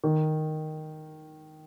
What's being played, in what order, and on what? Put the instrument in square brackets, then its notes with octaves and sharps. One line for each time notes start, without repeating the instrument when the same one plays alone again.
[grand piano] D#3